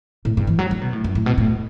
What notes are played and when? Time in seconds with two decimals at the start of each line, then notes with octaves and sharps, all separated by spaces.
0.25 A2
0.37 G2
0.47 E3
0.59 F#3
0.71 D3
0.81 B2
0.93 A2
1.04 F#2
1.15 A2
1.26 B2
1.38 A2